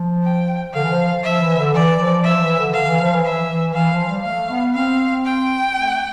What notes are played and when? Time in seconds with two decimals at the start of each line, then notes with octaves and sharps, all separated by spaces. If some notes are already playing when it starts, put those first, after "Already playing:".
Already playing: F3
0.23 G5
0.74 D3 F5
0.82 E3
0.91 F3
1.24 F3 E5
1.41 E3
1.57 D3
1.75 E3 D5
1.99 F3
2.24 F3 E5
2.34 F3
2.42 E3
2.58 D3
2.74 D3 F5
2.88 E3
3.00 F3
3.12 E3
3.24 E3 E5
3.49 E3
3.74 E3 F5
3.92 F3
4.08 G3
4.24 A3 F5
4.51 B3
4.75 C4 F5
5.25 G5
5.76 A3